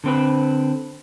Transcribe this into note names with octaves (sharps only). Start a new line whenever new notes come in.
D3 C4 B4